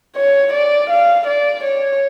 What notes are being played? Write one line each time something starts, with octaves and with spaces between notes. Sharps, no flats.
C#5
D5
F5
D5
C#5